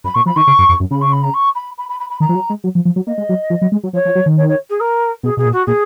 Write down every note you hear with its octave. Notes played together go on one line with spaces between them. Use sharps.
F#2 B5
A#2 C#6
F3 B5
D#3 C#6
C#3
F#2
F2
F#2
C#3 B5
C#6
B5
A#5
C#6
B5
B5
B5
B5
B5
D#3 A#5
F3
F#3
G#3
F#3
F3
F3
F#3
A#3 D#5
G#3
F#3
F3
F#3
G#3
F#3
F3 C#5
F3
F#3
D#3
C#5
C#5
G#4
A#4
B2 G#4
B2 G#4
A#2
F#4
A#2 G#4